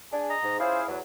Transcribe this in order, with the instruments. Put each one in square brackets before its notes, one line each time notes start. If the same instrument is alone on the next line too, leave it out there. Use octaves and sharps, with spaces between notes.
[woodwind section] D4 G#4
[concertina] D#5 A#5
[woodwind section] G#2
[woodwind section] C#4 F4 C5 [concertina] E4 G#4 F5
[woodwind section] E2 F#3